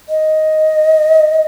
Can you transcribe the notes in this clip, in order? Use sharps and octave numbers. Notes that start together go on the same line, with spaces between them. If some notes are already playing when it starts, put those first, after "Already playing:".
D#5